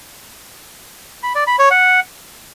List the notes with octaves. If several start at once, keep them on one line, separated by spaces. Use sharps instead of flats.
B5
D5
B5
C#5
F#5